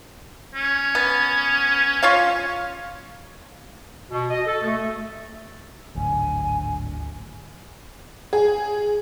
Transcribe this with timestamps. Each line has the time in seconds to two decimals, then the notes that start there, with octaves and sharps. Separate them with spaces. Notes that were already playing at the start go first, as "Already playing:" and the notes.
0.55 C#4
0.95 B3
2.03 F4 C#5 F5
4.10 B2
4.30 D#5
4.47 A4
4.63 A3
5.95 D1 G#1 D2 G#5
8.33 G#4